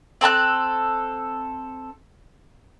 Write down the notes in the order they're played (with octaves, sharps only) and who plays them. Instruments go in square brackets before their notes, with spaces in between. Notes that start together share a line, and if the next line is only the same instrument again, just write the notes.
[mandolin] C4 A4 A5 F#6